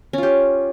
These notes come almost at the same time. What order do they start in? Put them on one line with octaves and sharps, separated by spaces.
C#4 F4 G4